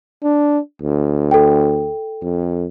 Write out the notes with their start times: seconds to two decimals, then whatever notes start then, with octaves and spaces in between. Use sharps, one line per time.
0.23 D4
0.82 D2
1.31 A4 G5
2.22 F2